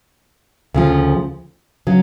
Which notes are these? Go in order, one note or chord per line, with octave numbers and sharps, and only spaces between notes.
D2 C#3 F3
C#3 F#3